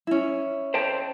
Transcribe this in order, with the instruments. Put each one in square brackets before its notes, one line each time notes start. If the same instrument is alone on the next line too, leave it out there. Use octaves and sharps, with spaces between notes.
[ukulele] C#4 E4
[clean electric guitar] C5 G5 A5